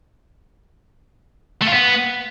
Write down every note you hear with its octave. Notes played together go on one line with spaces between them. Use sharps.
A3
F4
B3